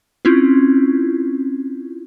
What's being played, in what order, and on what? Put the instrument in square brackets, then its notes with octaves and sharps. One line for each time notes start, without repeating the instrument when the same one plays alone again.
[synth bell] C4 C#4 E4 F4